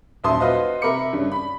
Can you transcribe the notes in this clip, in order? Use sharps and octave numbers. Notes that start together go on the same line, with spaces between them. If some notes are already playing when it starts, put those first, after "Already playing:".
D#1 F#2 E5 A5 C6 D#6
F4 F#4 B4 C5 D#5 F5
C3 A#4 E5 B5 D6 C#7
G2 C#3
B5